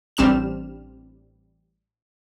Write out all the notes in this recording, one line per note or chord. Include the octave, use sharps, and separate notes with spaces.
A1 G3 C4 D4 F6 E7